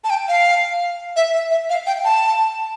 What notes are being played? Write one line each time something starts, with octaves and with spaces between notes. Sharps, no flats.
A5
G5
F5
E5
E5
E5
F5
G5
A5